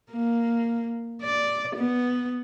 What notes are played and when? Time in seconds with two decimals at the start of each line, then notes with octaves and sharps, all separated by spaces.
0.11 A#3
1.22 D5
1.76 B3